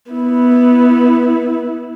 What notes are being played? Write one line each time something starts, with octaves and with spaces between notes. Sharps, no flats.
B3 E4